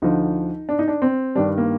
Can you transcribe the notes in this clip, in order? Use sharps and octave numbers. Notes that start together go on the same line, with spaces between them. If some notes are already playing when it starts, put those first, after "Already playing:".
D2 D3 F3 D#4
D4
D#4
D4
C4
G2 D#3 G3 D4
A#3